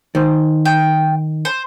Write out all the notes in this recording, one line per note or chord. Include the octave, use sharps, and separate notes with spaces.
D#3 C5
G5
C5